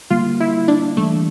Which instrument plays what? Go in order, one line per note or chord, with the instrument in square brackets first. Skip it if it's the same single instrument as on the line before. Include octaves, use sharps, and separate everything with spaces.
[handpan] D3 G3 A#3 [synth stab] F4
[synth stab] E4
D4
[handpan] E3 G3 D4 [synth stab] A3